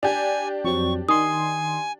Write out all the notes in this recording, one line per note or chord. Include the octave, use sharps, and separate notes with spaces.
D4 G4 G#5
F2 F#3 C4 C#6
D#3 G#5 C6 D#6